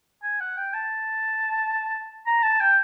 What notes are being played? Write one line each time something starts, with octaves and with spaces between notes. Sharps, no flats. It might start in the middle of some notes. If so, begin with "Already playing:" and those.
G#5
F#5
G5
A5
A#5
A5
G5